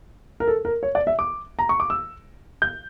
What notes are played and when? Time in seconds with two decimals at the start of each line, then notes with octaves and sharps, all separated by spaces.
0.40 A#4
0.47 A4
0.65 A#4
0.83 C#5
0.95 D5
1.07 E5
1.19 D6
1.59 A#5
1.69 C#6
1.80 D6
1.90 E6
2.62 G6